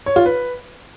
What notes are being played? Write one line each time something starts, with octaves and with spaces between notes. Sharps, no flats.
C#5
F4
B4